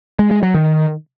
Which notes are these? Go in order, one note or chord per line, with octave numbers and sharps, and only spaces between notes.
G#3
G#3
F#3
D#3